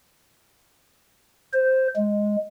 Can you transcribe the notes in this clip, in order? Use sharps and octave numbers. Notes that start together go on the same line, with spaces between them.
C5
G#3